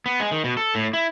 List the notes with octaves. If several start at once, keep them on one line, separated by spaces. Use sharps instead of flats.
B3
G#3
D#3
B2
A4
A2
E4